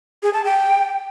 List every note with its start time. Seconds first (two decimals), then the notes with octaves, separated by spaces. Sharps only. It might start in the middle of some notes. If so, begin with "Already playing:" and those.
0.23 G#4
0.34 A5
0.44 G5